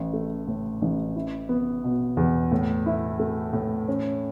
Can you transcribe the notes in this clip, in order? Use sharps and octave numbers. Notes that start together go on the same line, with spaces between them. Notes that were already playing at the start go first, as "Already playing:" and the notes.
Already playing: A1
A3
A2
A1
E4
B3
B2
E2
A2
E4
A3
A2
C#4